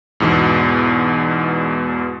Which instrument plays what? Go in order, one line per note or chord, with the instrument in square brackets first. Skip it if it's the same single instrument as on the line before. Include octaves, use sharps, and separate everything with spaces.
[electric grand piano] E2 G#2 B2